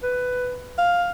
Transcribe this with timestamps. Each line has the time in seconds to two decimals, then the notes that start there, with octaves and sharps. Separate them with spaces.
0.03 B4
0.78 F5